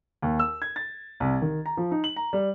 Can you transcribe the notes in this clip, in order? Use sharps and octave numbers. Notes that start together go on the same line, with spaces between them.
D#2
E6
G#6
A6
C2
D#3
A#5
F3
D#4
F#7
A#5
G3